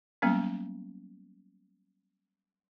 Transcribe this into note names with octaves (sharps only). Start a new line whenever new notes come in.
F#3 G3 A#3 B3 C#4